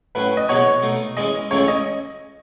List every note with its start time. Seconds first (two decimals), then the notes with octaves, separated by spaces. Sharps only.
0.15 A2 F#3 C#4 B4
0.37 D#5
0.49 E2 B2 F#3 B3 F#4 C#5
0.82 B2 A3 D#4
1.17 E3 G#3 C#4 D#5
1.51 C#2 C#3 E3 A3 C#4 C#5
1.68 D#5